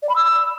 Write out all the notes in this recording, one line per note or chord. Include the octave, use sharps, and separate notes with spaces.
D5
B5
E6